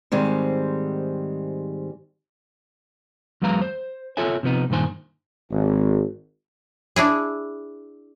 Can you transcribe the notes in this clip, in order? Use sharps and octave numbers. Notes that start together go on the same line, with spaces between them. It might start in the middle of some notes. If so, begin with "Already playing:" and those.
G#2 D#3 G3 G#3 C4
E2 F#3 G#3 B4 F5 A#5
C5
F4 A4 C#5 E5 G#5
C3 F3 B3 D#4
G2 A#2 D#3 C5 G#5
G#1
D4 E4 G#4